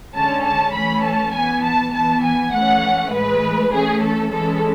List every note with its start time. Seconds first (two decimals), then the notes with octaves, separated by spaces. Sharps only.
0.14 D3 G#3 C#4 A5
0.44 A5
0.74 E3 A3 C#4 B5
1.04 A5
1.34 E3 B3 G#5
1.64 A5
1.93 E3 B3 A5
2.23 G#5
2.53 E3 A3 C#4 F#5
3.12 A2 E3 G#3 B4
3.73 E3 A3 C#4 G#4
4.02 A4
4.32 E3 G#3 C#4 A4